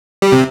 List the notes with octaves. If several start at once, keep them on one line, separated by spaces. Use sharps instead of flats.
G3
C3